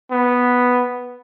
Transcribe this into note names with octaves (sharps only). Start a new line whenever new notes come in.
B3